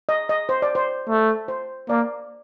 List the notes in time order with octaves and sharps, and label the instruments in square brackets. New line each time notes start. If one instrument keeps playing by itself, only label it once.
[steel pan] D#5
D#5
C5
D5
C5
[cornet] A3
[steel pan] C5
[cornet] A#3 [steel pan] D5